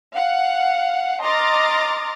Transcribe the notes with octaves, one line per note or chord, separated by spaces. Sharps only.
F5 F#5
D#5 A#5 C6 D6 F6 A6